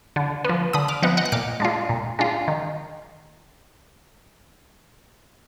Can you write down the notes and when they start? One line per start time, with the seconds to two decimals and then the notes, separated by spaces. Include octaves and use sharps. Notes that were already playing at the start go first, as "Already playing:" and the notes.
0.16 D3
0.45 F3 B3
0.73 D3 B5 D#6
0.88 D6 F6
1.02 F3 B3 D#5 F#5
1.17 D#5 F#5
1.25 F#6
1.32 A#2 D6 F6
1.60 G#3 D4 F4
1.89 A#2
2.19 G#3 D4 F4
2.48 D#3